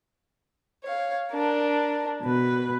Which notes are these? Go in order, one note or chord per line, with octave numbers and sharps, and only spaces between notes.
C#5 F5
D4 A#4
B2 B4